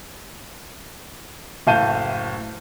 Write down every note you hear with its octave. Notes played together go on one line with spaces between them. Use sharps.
F#1 A2 F5 A5 G6 D#7